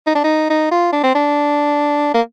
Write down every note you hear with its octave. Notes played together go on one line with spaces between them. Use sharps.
D#4
D4
D#4
D#4
F4
D4
C4
D4
A#3